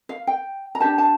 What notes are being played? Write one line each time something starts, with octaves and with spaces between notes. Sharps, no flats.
F5
G5
A#5
D4 G4 A#4 A5
A5